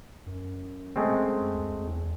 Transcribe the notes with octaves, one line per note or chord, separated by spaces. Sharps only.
F#2
G#3 A3 C4
D2
E2